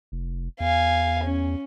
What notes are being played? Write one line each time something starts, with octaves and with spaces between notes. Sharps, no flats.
F1
E2 F5 G#5
C#4